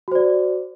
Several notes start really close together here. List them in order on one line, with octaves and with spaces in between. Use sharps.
F#4 C5 D5